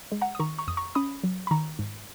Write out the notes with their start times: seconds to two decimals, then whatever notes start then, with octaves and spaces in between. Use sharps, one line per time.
0.12 G#3
0.21 F#5 A#5
0.35 D#6
0.39 D#3 A#5 C#6
0.59 A#5 C#6
0.67 F2 D#6
0.77 A#5 C#6
0.95 C#4 B5 D#6
1.24 F#3
1.47 B5
1.51 D#3 A#5 C#6
1.79 G#2